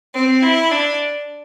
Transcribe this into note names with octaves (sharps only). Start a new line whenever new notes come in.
C4
E4
D4